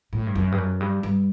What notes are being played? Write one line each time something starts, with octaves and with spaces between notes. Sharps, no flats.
A2
G2
F#2
G2
F#2
G2
G2